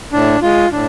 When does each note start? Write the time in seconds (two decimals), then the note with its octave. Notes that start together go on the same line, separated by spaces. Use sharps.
0.13 A2 D4
0.42 G#3 F4
0.72 A2 D4